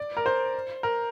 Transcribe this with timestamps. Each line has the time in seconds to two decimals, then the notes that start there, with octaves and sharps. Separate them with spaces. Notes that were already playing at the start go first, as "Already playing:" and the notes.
Already playing: D5
0.17 A#4
0.26 C5
0.83 A#4